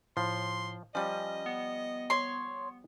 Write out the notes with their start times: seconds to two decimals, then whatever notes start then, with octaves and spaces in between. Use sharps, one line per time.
0.17 A2 F3 C6
0.95 F3 G3 C#4 D#5
1.46 B3
2.10 C#5 C6